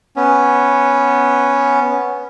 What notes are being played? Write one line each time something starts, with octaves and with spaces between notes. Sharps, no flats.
B3 C#4